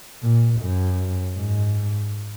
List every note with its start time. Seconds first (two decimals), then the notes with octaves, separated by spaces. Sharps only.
0.23 A#2
0.61 F#2
1.36 G#2